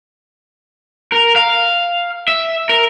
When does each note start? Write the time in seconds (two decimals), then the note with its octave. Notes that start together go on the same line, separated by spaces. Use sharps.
1.12 A#4
1.36 F5
2.28 E5
2.69 A#4